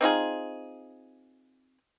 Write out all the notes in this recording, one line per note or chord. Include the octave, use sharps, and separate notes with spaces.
C4 D#4 F4 G#4